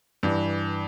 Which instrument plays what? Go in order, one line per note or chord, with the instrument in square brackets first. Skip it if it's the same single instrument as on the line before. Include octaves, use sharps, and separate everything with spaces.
[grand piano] G2 E3